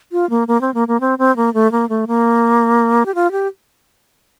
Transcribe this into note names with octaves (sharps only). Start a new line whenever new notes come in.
F4
A#3
A#3
C4
A#3
A#3
C4
C4
A#3
A3
A#3
A3
A#3
G4
F4
G4